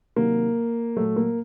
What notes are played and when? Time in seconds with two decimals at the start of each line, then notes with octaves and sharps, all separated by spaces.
0.16 C3 D#3 F#3 A#3
0.96 A#2 F#3 A3
1.16 A#3